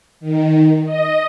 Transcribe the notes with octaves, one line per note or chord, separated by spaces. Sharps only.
D#3
D#5